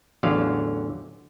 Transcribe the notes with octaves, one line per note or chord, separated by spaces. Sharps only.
A1 E2 D3 F#3 F5